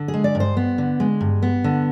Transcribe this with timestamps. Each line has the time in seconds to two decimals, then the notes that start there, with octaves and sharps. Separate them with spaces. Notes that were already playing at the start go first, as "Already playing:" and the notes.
Already playing: D3
0.08 G#4
0.14 G#3
0.24 D5
0.35 G2
0.40 C5
0.57 B3
0.78 D3
1.00 G#3
1.21 G2
1.43 B3
1.64 D3